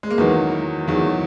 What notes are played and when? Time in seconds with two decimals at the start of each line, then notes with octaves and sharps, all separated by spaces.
0.03 G#3
0.11 A#3
0.18 E2 D#3 F#3 B3
0.88 E2 D#3 F#3